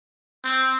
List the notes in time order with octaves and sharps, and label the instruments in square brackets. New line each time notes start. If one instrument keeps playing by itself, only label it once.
[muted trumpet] C4